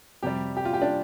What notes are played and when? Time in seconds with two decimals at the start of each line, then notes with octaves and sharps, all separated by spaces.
0.23 F2 C3 G3 G4
0.57 G4
0.65 F4
0.73 G4
0.82 D4